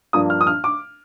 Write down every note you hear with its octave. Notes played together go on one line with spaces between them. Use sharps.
G2 F3 A#3 D4 D#6
F6
D#6
F6
D6